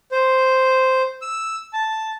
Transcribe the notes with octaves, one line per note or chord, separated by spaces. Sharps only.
C5
E6
A5